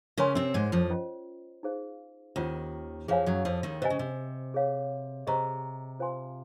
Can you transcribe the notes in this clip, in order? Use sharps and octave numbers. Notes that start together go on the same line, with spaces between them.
C#3 C#4 A#4 C#5 G#5 C6
C3 C4
G#2 G#3
F2 F3
C#4 F4 C5 D#5
D#4 G#4 C5 F5
D#2 D#3 C#4 F4 C5 F#5
F2 F3 G#4 C#5 F5 G#5
F#2 F#3
F2 F3
D#2 D#3
C3 C5 D#5 G#5
C#3
C3
G#4 C#5 F5
C3 G#4 C5 D#5 A#5 C#6
F4 C5 F5 G#5 C6